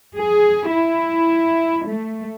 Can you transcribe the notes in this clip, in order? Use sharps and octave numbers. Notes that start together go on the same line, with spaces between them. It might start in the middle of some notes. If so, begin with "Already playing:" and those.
G#4
E4
A3